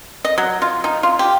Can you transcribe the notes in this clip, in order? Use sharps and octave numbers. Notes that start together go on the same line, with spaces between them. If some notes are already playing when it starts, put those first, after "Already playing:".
D#5
F#3
F4
D#4
F4
G4